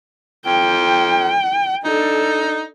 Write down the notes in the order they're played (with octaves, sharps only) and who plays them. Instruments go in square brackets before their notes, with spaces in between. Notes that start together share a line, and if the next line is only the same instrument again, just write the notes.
[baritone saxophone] F2 [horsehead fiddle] G5
[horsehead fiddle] D4 A4 [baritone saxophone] D#4